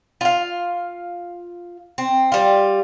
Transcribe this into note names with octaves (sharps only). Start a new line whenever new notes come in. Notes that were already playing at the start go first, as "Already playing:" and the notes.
F4 F5
C4
G3 F4